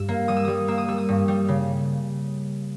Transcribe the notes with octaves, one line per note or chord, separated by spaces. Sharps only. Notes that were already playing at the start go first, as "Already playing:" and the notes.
Already playing: G2 E6
A#3
G3 D#6
E6
G3 D#6
A#3 E6
D#6
G3 E6
D#6
G2
G3
C#3